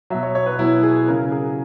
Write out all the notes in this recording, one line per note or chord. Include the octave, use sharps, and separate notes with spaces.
B2 F#3 E5
C#5
C#5
B4
B2 F#3 E4
G#4
C#3 F#3 A#4
G#4